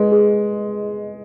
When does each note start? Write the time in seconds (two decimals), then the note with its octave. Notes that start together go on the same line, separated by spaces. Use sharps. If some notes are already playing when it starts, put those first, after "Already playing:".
Already playing: G#3 B4 D#5
0.12 G#4